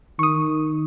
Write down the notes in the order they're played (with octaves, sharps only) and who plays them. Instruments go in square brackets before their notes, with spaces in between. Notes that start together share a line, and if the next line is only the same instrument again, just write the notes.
[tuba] D#3 [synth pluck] C#6 D#6